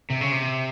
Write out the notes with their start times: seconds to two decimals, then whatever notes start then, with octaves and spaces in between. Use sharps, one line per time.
0.10 C3
0.21 C#3
0.32 C3